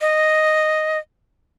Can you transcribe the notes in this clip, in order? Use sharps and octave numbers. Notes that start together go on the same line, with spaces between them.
D#5